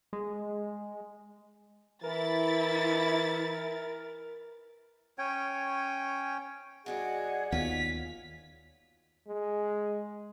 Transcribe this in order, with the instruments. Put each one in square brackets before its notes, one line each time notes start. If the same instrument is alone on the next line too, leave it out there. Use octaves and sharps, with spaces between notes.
[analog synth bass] G#3
[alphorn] E3 [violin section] E4 A6 [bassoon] A#4
[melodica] C#4 C#5 G5
[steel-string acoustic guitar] G2 D4 F#4 [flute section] G#4 D#5 F#5
[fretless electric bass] D#2 D#3 B3 [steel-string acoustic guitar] F4 C#5 [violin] B6
[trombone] G#3